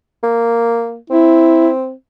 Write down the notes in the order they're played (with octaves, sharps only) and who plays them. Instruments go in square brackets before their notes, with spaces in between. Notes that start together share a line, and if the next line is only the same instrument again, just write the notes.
[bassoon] A#3
[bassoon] C4 [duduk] E4